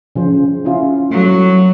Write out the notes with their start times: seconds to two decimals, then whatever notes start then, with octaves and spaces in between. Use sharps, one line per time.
0.16 C#3 F3 C5
0.65 C#4 E4 F4
1.11 F#3 A3